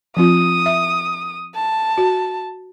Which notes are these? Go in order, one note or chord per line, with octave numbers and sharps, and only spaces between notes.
F3 C4 F4 D#6
E5
A5
F#4